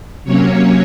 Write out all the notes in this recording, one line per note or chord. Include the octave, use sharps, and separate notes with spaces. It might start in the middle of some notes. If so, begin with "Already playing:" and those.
C3 F#3 A#3 C#4 C#5